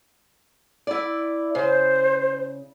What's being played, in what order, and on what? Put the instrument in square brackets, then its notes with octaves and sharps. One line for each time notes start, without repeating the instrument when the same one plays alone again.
[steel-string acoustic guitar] E4 D5
[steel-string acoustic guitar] C#3 [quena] C5